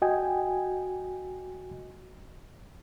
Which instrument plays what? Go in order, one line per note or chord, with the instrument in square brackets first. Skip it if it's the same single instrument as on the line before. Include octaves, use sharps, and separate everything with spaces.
[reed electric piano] F#4 D#5 G5 G#5